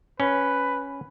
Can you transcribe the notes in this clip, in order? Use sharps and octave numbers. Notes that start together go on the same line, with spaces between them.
C#4 B4